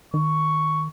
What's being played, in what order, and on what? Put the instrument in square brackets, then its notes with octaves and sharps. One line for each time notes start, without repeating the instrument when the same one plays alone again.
[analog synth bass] D#3 [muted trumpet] C#6